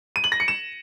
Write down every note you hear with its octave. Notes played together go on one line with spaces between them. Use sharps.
D#7
F#7
A#6
C#7
E7